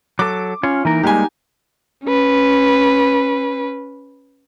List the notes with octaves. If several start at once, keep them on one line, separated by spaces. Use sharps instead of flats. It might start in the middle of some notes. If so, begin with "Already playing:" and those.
F#3 A4 D6
C#4 F4 C#5
E3 A#3 D#4 A#4
G3 G#3 A#3 G4 G#5
C#4 B4